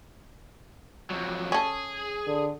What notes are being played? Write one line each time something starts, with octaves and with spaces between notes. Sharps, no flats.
F2 F#3
C#4 G#4 A4
D3